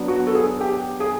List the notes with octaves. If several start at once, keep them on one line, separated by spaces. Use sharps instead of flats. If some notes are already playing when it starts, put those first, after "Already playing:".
Already playing: F#3 B3 D4
F#4
A4
G#4
G4
G#4